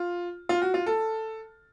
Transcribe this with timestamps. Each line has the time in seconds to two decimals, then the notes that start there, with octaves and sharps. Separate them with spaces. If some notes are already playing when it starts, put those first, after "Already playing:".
Already playing: F4
0.49 F4
0.62 F#4
0.74 F4
0.86 A4